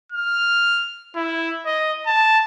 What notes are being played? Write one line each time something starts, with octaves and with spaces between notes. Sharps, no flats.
F6
E4
D#5
A5